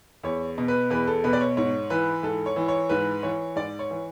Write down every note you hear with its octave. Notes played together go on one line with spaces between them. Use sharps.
E2 C#5
B2
B4
E2 B4
A4
B2 B4
D5
C#5
G#2 C#5
E3 B4
G#2 A4
C#5
E3
C#5
G#2 B4
E3 C#5
G#2 D5
C#5
E3